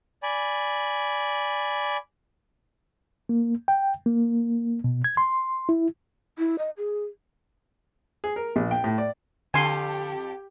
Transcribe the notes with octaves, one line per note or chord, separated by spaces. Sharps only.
D5 G#5 B5
A#3
G5
A#3
B2
G#6
C6
E4
E4
D#5
G#4
G#4
A#4
A#1
G5
A2
D5
F2 D3 G4 A4 G#5 C6